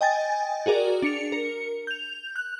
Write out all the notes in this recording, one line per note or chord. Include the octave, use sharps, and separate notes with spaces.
D#5 G5 G#5 A6
F#4 G#4 A#4 D5
D4 C#7 F7
A#4 C#7
G6 F7
F#6